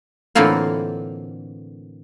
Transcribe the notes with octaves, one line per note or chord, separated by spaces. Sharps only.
A2 D3 E3 A#3 C4 F4